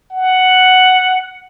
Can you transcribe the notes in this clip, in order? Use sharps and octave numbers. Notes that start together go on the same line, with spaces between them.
F#5